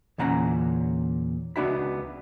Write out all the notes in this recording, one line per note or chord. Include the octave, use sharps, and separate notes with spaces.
E2 A#2 D3 C#4 F#5 A#5
C#2 B3 D4 F#4 E5 B5